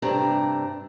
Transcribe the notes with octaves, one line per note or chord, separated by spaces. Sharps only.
G2 C3 A3 D4 A#5